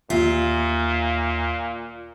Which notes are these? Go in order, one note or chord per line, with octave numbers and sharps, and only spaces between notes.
D#2 A#2 F4 E5